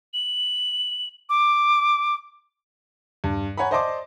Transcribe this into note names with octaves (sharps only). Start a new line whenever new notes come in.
F#7
D6
G2
C#5 F#5 G#5 A#5 B5
C5 D5 D#5 A5 C6 D6